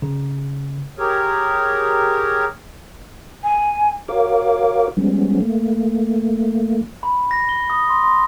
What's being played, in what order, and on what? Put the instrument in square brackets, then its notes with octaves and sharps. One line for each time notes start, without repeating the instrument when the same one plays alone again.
[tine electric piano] C#3
[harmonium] G4 G#4 A#4 C#5
[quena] G#5
[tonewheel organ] F#4 A#4 C#5 F5 D6
F3 G3 G#3 B3 C#4
A3 A#3
[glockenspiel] B5
A#6
G7
D#6
C6
C6